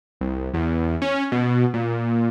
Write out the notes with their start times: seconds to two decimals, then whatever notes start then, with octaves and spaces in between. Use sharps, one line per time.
0.21 C2
0.54 E2
1.02 C#4
1.32 B2
1.74 A#2